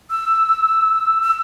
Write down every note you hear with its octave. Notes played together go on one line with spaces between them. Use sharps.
E6
E6